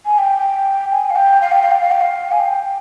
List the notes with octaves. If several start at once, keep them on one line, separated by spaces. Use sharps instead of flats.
G#5
G5
G#5
F5
G5
F5
G5
F5
G5
F5
G5
F5
G#5
G5
G5